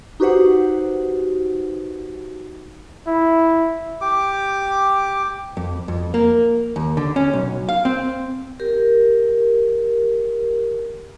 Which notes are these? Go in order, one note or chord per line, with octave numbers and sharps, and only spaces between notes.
D#4 F#4 G4 B4 C5 F#5
E4
G4 D6
F2
F2
A#3
D#2
D3
C#4
B1
F5
C4
G4 A#4